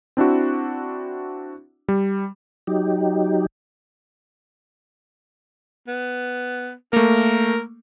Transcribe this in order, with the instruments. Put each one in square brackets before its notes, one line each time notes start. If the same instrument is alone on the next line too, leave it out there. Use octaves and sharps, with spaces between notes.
[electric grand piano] C4 D4 E4 F#4
G3
[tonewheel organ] F#3 D#4 G4
[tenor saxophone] B3
[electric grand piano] A3 A#3 [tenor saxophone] A#4